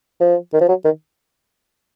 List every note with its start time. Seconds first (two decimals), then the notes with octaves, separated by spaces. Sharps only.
0.21 F3
0.54 D#3
0.61 F3
0.69 F#3
0.85 D#3